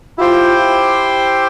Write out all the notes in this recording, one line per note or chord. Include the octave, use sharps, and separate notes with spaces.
E4 F4 G4 C5 G5